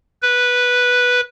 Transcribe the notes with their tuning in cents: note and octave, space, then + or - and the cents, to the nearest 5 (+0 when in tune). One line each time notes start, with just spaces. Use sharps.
B4 -5